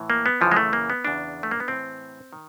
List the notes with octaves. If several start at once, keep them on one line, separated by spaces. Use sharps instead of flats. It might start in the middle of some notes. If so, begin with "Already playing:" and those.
Already playing: A2 E3
A#3
B3
F#2 C#3 E3 F3
G#3
A3
A#3
B3
E2 C#3 E3 D4
A3
A#3
B3
A2 E3 C4
D#3